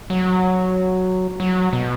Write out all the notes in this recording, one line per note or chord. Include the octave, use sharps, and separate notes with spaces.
F#3
F#3
B2